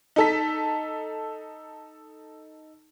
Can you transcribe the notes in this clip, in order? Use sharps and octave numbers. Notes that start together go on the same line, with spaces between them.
D#4 A4 B6